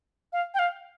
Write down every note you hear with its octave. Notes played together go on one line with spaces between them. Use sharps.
F5
G5
F5